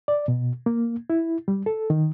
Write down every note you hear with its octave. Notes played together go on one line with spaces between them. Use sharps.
D5
B2
A#3
E4
G3
A4
D#3